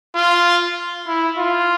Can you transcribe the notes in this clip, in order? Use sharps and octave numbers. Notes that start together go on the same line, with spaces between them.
F4
E4
F4